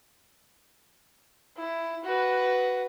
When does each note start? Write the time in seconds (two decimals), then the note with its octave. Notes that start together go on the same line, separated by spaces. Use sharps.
1.57 E4
2.04 F#4 B4